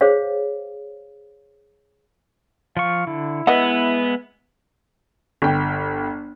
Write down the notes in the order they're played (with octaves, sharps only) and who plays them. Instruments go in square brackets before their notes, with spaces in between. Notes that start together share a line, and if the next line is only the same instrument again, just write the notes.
[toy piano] G#4 C5 C#5 F5
[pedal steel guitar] F3 C#6 [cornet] F5
[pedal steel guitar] D3 [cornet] E4
[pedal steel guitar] G#3 E5 [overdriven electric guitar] B3 [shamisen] B4 D#5 F#5
[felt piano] G1 G5